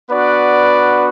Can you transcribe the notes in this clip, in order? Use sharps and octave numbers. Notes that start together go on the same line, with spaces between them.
B3 D4 F#4 B4 D5